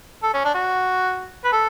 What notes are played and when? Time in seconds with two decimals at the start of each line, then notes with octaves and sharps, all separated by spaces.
0.23 A4
0.34 C#4
0.44 D4
0.54 F#4
1.44 B4
1.52 A4